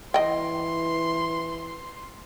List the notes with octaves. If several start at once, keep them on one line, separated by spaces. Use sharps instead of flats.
E3 D#5 G5 C6